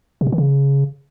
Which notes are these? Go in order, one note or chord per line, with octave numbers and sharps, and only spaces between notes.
C3
B2
D#3
C#3